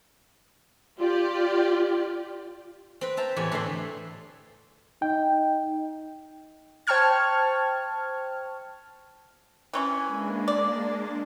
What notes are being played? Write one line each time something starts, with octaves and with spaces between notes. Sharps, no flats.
F4 G4 D5
C4 B4
C5 E5 A5 A#5
E2 A2 G4 G#5
A2 D3 E4 B4 E5 C6
D#4 G5
C5 G5 A5 C#6 F6 G#6
E3 C#4 E4 G#5
G#3 A#3 D4
D5